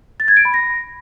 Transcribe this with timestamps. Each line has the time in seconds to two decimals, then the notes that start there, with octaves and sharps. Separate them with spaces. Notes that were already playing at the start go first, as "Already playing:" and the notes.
0.20 A6
0.28 G#6
0.37 D7
0.45 B5
0.54 A#6